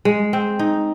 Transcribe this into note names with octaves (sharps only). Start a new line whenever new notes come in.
G#3
C4
D#4